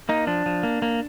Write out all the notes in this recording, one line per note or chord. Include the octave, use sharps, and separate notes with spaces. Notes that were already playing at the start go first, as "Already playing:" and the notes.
A#3 D#4
F3 D4
F3
A#3
A#3